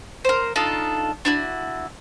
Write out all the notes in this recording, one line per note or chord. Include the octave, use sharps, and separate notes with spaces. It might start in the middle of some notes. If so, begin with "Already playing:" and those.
A#4 C5
D4 D#4 F4 A4
D4 E4 F#4